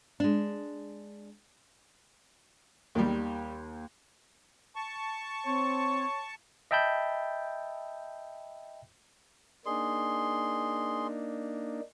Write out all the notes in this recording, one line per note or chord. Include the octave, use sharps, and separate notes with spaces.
G#3 D4
D#2 D#3 G3
A5 C#6
C4 C#5
D#5 E5 G5 A5 B5 G6
A#3 D4 D#4 G#4 C6